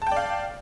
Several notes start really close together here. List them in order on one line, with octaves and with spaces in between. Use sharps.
A5 G5 D5 F5